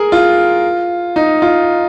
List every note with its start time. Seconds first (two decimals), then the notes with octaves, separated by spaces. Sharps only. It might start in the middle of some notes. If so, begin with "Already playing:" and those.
Already playing: G#4 A#4
0.12 F4
1.16 D#4
1.42 F4